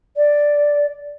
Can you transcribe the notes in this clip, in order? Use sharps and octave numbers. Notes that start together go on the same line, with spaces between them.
D5